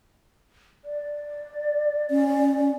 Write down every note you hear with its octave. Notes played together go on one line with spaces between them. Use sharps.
D5
C#4